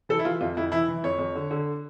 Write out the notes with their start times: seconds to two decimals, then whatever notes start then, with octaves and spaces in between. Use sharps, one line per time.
0.09 E3 A4
0.19 E4
0.25 E3 F4
0.41 F2 F4
0.57 F2 E4
0.72 E3 E4
0.88 E3
1.04 F2 C#5
1.19 F2
1.35 D3
1.51 D3